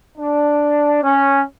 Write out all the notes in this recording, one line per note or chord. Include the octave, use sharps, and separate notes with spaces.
D4
C#4